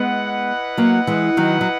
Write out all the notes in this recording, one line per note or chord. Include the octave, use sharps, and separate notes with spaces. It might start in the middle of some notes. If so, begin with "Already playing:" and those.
Already playing: G#3 B3 E4 B4 D#5 F#5
F#3 A#3
E3 G#3
D#3 F#3
F#3